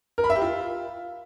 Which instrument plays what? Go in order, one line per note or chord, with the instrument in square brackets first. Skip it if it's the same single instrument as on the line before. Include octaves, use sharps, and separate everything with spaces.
[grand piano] A#4
B5
E5
G4
F4